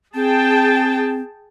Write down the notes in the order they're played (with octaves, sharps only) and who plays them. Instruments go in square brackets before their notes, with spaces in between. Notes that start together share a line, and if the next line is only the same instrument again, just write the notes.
[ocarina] C4 [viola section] G#4 G5 A5